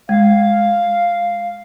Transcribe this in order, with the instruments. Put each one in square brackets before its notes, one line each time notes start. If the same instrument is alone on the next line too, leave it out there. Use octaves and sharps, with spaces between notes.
[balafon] G#3 [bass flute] F5